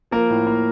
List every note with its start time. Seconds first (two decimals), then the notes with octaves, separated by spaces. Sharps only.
0.11 F3 A#3 A#4
0.30 A2
0.47 A#3